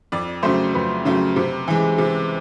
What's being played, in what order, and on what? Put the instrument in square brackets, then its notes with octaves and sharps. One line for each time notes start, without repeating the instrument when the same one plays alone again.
[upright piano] F2 D5
C#3 F#3 A3 C5
F2 B4
C#3 F#3 A3
C3
E3 G#3
C3